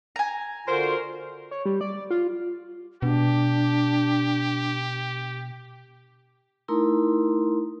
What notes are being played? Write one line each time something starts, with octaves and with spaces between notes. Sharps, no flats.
G#5 A#5
D3 F4 F#4 A#4 C5
C#5
G3
D5
F4
B2 D4 G4
A3 D#4 E4 A#4 A#5 C6